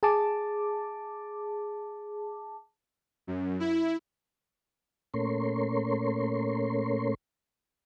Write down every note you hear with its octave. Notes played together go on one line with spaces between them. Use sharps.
G#4 A5 D6
F#2
E4
A#2 A3 C#4 A#4 C#5 C6